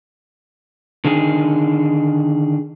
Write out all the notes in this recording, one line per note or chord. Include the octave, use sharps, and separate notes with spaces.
D3 D#3 D#4 G#4